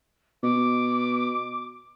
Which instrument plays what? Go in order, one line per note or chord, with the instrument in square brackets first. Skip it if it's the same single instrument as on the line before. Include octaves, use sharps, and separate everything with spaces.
[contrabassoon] B2 [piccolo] D6